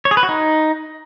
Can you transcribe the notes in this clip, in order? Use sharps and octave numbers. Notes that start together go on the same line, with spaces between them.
C#5
G#4
B4
F#4
D#4